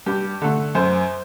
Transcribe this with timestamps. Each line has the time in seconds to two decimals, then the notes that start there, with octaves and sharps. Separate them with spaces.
0.06 G2 G4
0.42 D3 A3 A4
0.75 F#2 C5